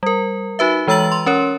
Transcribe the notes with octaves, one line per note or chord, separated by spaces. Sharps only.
G3 A#4
D#4 F#4 B4 E5
E3 G#3 A#5 E6 A6 F#7
C6
C#4 A#4 C#5